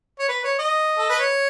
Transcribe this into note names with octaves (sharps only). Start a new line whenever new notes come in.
C#5
B4
C#5
D#5
A4
B4
C#5